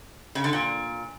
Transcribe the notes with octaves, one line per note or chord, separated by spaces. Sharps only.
C#3
D3
A#2